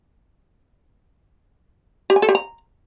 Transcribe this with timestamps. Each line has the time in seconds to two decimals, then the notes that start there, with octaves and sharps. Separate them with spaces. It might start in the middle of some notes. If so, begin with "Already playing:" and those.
2.10 G4
2.16 G#5
2.22 A4
2.29 G4
2.35 A#5